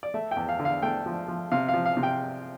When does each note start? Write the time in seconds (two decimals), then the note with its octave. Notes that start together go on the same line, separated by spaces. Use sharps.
0.03 D5
0.14 A3 E5
0.31 G5
0.36 E2
0.49 F5
0.59 D3
0.65 F5
0.82 A3 G5
1.06 F3
1.28 F3
1.52 C3 F5
1.68 F5
1.74 F3
1.86 F5
1.97 C3
2.03 G5